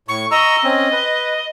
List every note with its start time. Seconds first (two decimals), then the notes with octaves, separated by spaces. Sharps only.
0.08 A2 C#6
0.31 D#5 A#5 C#6 E6
0.64 C4 C#4
0.92 B4